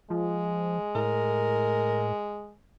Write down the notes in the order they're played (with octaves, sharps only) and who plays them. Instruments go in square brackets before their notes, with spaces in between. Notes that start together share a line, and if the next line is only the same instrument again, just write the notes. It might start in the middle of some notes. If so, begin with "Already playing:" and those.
[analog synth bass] F3 [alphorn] G#3
[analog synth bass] A2 [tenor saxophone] A#4